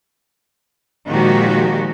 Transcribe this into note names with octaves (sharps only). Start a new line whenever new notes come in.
A#2 D#3 F3 G#3 F#4 G4